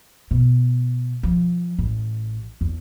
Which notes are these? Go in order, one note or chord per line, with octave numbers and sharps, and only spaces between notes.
B2
F3
A1
E2